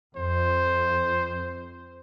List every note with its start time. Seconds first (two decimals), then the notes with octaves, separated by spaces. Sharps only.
0.17 F2 C5